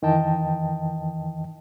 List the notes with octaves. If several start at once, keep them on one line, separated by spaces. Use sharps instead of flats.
F2 D#3 E3 D#5 G5 A5